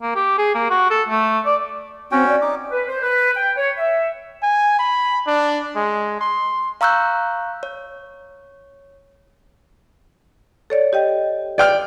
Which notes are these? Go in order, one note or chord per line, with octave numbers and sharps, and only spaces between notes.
A#3
G4
G#4
A#3
F#4
A4
A3
D5
C4 C#4 F#4 G5
D5
D#4 D6
B4
C5
B4
G5
C#5
E5
G#5
B5
D4
G#3
C6
F5 A#5 C#6 E6 F#6 G6
C#5
A4 C#5 D5
G4 D#5 G5
D5 G5 F6